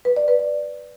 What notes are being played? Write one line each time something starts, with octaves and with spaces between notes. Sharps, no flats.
B4
D5
B4
D5